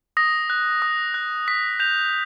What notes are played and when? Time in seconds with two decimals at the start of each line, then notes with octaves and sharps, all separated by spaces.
0.17 D#6 A#6
0.50 F#6
0.82 D#6
1.14 F#6
1.48 D#6 B6
1.80 G6 F7